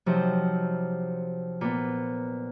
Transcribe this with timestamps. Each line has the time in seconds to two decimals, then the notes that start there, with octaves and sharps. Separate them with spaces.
0.06 C3 F3 F#3 D#4
1.61 A#2 B3